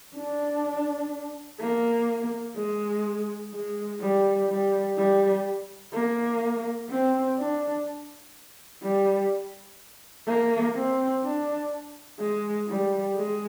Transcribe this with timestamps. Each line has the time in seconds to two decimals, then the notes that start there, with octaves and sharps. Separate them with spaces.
0.16 D4
1.60 A#3
2.57 G#3
3.53 G#3
4.01 G3
4.49 G3
4.97 G3
5.94 A#3
6.90 C4
7.38 D4
8.83 G3
10.27 A#3
10.75 C4
11.24 D4
12.20 G#3
12.68 G3
13.16 G#3